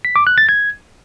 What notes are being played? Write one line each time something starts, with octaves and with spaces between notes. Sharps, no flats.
B6
D6
F#6
A6
G#6